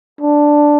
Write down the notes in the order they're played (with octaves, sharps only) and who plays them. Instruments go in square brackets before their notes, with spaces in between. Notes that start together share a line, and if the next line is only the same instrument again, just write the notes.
[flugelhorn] D4